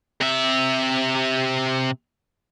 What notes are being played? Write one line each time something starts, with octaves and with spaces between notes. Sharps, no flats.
C3 E5